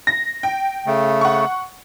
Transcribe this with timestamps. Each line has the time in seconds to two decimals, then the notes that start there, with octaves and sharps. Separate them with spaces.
0.07 A#6
0.43 G5
0.86 C#3 A3
1.21 F#5 C#6